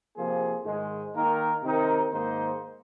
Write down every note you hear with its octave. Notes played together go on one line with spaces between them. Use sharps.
C3 F3 A#3 G#4 C5
G#2 D#3 G#3
D#3 A#3 D#4 A#4
C3 D#3 C4 D#4 A#4
G#2 D#3 A#3 D#4 C5